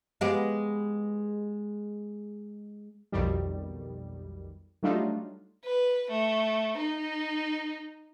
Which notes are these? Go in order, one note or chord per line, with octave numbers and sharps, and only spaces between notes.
G#3 B3 G4
B1 F2 D#3 G3
F#3 G3 A3 D4 D#4 F4
B4
A3
D#4